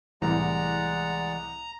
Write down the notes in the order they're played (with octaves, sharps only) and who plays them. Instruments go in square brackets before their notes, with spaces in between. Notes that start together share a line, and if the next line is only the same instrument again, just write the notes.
[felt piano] C2 A2 [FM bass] E3 [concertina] G#3 D5 F#5 [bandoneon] A#5